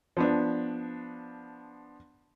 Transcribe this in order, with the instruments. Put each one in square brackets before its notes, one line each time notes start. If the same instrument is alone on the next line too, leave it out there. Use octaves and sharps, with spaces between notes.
[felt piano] F3 B3 D4